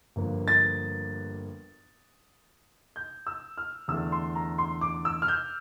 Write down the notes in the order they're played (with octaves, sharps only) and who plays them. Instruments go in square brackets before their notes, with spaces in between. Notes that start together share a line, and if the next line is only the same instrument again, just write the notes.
[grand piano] G1 G2 F3 A#3
[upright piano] A6
G6
E6
F6
[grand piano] E2 D3 A3 D4 [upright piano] E6
[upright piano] C6
A#5
C6
D6
E6
F6
G6